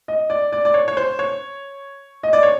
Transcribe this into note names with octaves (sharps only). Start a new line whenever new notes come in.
D#5
D5
D5
D5
C#5
C#5
C5
C#5
D#5
D5
C#5